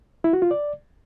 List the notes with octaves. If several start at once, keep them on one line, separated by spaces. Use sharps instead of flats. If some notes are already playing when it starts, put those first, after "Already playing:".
E4
F#4
F4
D5